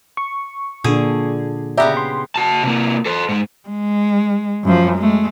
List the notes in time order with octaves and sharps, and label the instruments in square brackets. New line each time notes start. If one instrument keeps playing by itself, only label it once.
[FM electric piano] C#6
[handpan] A#2 D4 [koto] D3 G#4
[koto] C#3 B3 G4 [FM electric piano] D5 E5 A#5
[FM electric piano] C6
[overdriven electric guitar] F#4 A5
C3 A#3
A4 C5
G#2 G#3
[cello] G#3
F#2 F3
G#3 A3